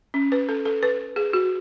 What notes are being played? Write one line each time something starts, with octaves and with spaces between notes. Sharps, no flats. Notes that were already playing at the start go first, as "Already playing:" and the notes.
C#4
B4
A4
A4
B4
G#4
F#4